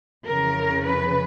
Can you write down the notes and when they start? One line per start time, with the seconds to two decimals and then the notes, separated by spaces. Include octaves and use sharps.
0.25 F2 C#3 E3 A#4
0.86 B4